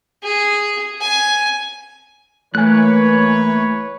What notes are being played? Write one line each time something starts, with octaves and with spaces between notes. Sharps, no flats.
G#4
G#5
E3 A3 A#3 B4 C#5 G#5 F#6